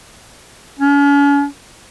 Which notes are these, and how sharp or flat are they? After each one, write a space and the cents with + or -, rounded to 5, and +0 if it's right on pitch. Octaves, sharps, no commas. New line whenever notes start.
C#4 +40